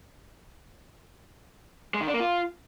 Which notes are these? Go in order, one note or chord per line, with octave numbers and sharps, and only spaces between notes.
G#3
D#3
D4
A#3
F4